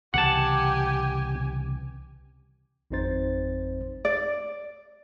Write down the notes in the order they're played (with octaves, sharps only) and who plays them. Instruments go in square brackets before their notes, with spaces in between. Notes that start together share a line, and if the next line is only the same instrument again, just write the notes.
[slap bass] C2 C#3 E3 [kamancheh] G4 G#5 [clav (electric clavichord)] F#5 A5
[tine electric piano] G#1 F2 C4 D#4 C5 A6
[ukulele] D5